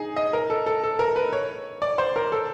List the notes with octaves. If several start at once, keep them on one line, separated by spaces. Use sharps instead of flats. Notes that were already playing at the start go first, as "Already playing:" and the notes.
Already playing: D#4 G#4
D#5
A#4
A4
A4
A4
A#4
B4
C#5
D5
C5
A#4
A4